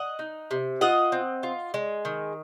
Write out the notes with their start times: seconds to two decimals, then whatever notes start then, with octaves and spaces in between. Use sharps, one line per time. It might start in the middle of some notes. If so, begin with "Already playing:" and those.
Already playing: D#5 F#5
0.19 D#4
0.51 C3
0.81 F4 D#5 F#5
1.12 C4
1.43 F4
1.74 G#3
2.05 D#3